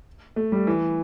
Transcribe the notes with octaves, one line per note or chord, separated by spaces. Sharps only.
A3
G3
E3